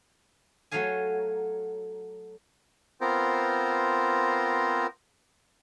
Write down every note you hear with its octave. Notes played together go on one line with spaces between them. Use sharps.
F#3 A3 C#5 F5 G#5
B3 C4 F4 A#4 C5